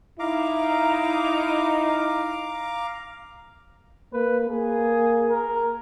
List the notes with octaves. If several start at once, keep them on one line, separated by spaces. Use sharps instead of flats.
D#4 E4 F5 A#5 D6
A#3 B4
A#3 G#4
A#4